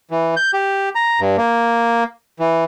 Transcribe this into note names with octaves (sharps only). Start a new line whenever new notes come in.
E3
G6
G4
A#5
G2
A#3
E3